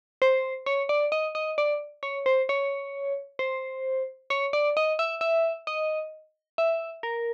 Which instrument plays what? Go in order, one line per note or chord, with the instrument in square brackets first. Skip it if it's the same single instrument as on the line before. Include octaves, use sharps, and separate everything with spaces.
[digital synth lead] C5
C#5
D5
D#5
D#5
D5
C#5
C5
C#5
C5
C#5
D5
D#5
E5
E5
D#5
E5
A#4